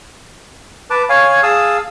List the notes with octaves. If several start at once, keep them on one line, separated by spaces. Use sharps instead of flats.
B4 A5 D6
C#5 F5 G#5
G#4 F5 A5 D#6 E6